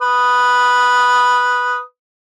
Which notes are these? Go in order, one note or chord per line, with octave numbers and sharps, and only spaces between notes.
B4 D#6